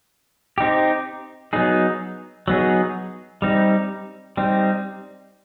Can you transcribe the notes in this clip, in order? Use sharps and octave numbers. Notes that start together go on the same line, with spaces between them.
C4 D#4 G4
F#3 B3 D#4 G#4
F#3 B3 D#4 G#4
G3 C4 D#4
G3 C4 D#4